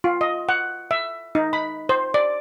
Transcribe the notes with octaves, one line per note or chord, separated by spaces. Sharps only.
F4
D#5
F#5
E5
D#4
B5
C5
D5